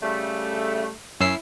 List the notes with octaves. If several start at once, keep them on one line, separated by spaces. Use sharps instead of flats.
C#3 G3 A3
F#2 C#4 E4 E6 C7